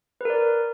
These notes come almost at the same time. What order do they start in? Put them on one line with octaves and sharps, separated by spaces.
B4 A#4 D5